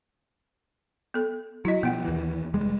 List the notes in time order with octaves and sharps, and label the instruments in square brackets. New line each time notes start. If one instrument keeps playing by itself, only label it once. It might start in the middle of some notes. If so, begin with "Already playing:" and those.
[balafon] B3 A4
[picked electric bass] F#3 [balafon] E4 D#5
[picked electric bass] B2 F3 [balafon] B3 F#5
[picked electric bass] D#2 E3
F1 G3 G#3